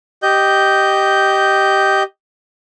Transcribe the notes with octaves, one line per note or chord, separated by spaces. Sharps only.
G4 D#5 G6